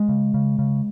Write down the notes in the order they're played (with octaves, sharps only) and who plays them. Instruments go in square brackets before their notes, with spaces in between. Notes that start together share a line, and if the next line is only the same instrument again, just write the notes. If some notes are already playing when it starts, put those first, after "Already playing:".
Already playing: [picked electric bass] G#3
C#3
C#3
C#3